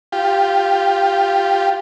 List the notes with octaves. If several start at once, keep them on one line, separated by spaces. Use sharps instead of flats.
F4 G4